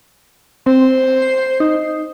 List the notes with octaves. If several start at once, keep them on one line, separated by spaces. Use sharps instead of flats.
C4 C5
C7
D#4